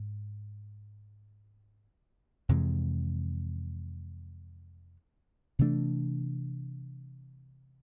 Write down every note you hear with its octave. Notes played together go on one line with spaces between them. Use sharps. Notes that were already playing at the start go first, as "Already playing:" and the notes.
Already playing: G#2
F2 C3 E3 G#3
C3 E3 A3 D4